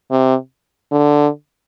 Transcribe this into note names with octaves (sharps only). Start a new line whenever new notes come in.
C3
D3